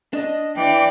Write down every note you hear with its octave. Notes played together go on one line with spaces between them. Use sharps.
D4 D#5
E3 D5 G5